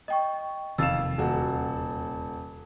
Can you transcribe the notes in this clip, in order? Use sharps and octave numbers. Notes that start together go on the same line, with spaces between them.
D#5 G5 C#6
E1 F2 C3 D#3 F5 E6 A6 E7
D#1 F#4